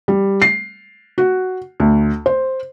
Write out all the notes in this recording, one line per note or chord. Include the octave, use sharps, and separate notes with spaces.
G3
C7
F#4
D2
C5